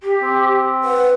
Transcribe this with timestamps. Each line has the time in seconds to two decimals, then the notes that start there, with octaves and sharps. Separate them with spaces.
0.01 G4
0.23 C4
0.84 B4 F#5